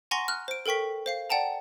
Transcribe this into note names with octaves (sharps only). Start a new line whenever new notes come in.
F#5 G#5 A#5 C6 C#6 A#6
F6 F#6
C5 D7
A4 A#4 G5 C#6 B6
C5 F5 C7
D5 F#5 G5 A5 A#5